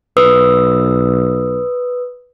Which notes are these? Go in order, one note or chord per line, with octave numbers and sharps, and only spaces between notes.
B1 B4 D#6 E6